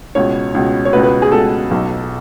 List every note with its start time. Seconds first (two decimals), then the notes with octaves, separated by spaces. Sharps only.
0.15 C#2 B2 C#5
0.55 C#2 B2
0.85 C#5
0.93 C#2 B2 B4
1.03 B4
1.22 G#4
1.32 C#2 B2 A4
1.71 B1 B2